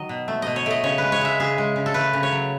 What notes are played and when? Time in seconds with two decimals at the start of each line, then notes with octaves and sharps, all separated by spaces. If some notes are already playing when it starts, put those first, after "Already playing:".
Already playing: D#3 F#3 D#5
0.09 B2
0.28 A3
0.42 B2 D#5
0.56 C#5
0.66 A3 D#5
0.83 C#3 C#5
0.98 G#3 B4
1.12 C#5
1.21 G#3 E5
1.40 C#3 G#4
1.58 G#3
1.76 C#3
1.86 A4
1.94 A3 B4
2.13 C#3
2.23 C#5
2.31 F#3